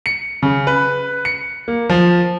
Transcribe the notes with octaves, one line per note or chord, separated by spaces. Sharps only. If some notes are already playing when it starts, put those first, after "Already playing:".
C#7
C#3
B4
C#7
A#3
F3